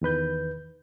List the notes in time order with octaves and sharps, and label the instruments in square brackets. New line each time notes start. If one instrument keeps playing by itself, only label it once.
[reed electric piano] E2 D#3 B4 G6